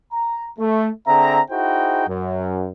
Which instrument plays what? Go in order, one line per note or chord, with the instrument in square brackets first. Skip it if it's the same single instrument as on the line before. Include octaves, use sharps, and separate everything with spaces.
[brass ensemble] A#5
A3
D3 C4 G#4 E5 A#5
D#4 E4 F#4 G#4 C5 G5
F#2